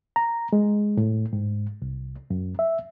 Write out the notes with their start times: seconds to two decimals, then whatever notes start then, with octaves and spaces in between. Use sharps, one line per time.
0.16 A#5
0.53 G#3
0.97 A2
1.33 G#2
1.82 C2
2.30 F#2
2.59 E5